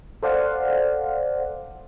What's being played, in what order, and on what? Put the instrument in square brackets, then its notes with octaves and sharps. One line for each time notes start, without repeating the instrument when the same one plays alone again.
[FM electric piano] A4 C5 D5 F5 F#5